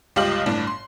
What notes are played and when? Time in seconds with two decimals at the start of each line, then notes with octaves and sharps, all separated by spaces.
0.16 G1 C#2 F4 G4 D#5 F#7
0.46 G1 A2 D4
0.67 C6